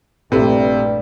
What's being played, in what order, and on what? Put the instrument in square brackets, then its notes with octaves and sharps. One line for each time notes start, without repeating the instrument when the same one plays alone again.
[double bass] A#1 A3 [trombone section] G2 G3 [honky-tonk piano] C3 [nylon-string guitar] E4 A4 B4